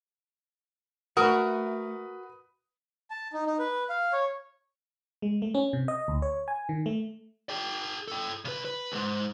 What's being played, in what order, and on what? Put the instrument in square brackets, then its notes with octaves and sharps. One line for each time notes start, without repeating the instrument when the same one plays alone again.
[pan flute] A3 [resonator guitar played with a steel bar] F#4 A#4 [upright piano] B4 D#6
[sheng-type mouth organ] A5
D#4
D#4
B4
F5
C#5
[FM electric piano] G#3
A3
C#4
C3
D#5
D2
C#5
G#5
D#3
A3
[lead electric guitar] G#4 G5
A4 G5
C#3 B4
B4
C#2 G#2